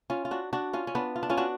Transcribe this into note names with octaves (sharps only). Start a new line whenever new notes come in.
C#4 F4
F4
D4 F#4
D4 F#4
C#4 F4
C#4
B3 D4
F4
D4
C#4 F4
D4 F#4